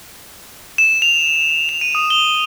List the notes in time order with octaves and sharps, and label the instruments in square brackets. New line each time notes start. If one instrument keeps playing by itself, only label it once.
[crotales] E7
F7
F7
D#7
D#6
G7